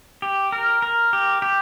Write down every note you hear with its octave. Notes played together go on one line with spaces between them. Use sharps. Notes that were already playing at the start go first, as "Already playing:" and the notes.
G4
A#4
A#4
G4
G4